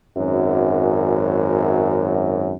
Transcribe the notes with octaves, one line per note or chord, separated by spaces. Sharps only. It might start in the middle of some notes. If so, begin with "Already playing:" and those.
G#1 F#2